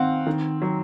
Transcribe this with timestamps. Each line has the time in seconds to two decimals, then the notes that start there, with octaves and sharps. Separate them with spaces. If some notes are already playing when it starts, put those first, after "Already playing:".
Already playing: D#3 C4 F5 F#5
0.27 D#3
0.62 F#3